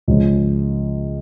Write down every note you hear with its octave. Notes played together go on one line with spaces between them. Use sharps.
C#2 C#3 F3